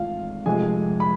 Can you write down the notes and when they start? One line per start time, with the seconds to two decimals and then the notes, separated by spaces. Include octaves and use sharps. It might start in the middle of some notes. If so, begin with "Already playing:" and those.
Already playing: G#1 G#2 E3 A3 F4 F5
0.46 F1 F2 C3 F3 G#3 G#4 G#5
1.00 B5